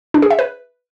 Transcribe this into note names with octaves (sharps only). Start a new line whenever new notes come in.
D4
G#4
E5
B4